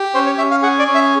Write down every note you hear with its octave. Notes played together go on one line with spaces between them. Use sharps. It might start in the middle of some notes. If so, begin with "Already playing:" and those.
Already playing: G4
C#4 C5
C#5
C#4 E5
F5
G#4 F#5
D5
C#4
E5